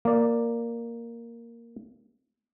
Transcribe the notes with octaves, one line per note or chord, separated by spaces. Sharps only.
A#3 D5